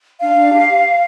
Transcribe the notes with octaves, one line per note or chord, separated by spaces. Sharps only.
D4 F5
D4
G4